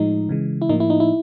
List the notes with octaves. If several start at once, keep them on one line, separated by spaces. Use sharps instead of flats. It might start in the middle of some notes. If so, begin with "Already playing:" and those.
Already playing: A2 F3 G#3 D#4
C#3 E3 G#3
E4
A2 F3 A#3 D#4
E4
D#4
E4